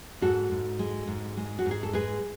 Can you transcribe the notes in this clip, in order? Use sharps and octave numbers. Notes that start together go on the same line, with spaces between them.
G#2 F#4 A4
G#2
G#3
G#2
G#3
F#4
G#2
G#4
A4
G#3 G#4 B4